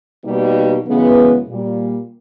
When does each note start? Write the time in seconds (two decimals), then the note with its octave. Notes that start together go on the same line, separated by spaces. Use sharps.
0.24 B2 G3 A#3 D#4
0.86 F#2 C#3 E3 G#3 B3
1.48 A#2 G3 A#3